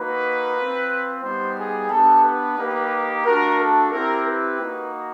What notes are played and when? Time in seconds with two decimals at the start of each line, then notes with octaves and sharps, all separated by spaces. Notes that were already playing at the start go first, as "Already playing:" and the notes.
Already playing: A#3 D#4 F#4 B4
0.56 C4 F4
1.22 G3 B3 D#4 G4 C5
1.57 G#4
1.90 B3 D4 G4 A4
2.23 B4
2.57 A#3 D#4 G4
3.24 A3 D4 F#4 A#4
3.58 A4
3.91 C4 E4 G4 A#4
4.26 B4
4.59 A#3 D#4 F#4